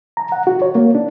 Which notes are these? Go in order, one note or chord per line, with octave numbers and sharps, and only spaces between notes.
A#5
F#5
F#4
C#5
A#3
D4